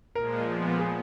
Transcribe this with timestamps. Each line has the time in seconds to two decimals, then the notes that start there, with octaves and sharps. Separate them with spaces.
0.15 A#2 F3 G#3 A#4
0.47 A#2 F3 B3
0.79 G#4